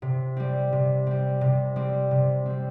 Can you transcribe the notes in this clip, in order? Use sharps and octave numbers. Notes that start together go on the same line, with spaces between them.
C3
G3 C4
C3
G3 C4
C3
G3 C4
C3
G3 C4